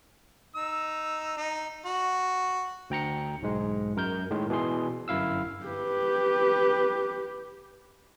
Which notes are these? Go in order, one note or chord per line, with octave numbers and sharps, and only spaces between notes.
D#4 E6
D#4
F#4
D2 G5 A#5 C#7
B1 G#2 G#3
F#2 A#4 G6
A2 D#3 G#3
B2 E3 G#4 C6
G1 F#2 E4 F5 E6
G4 B4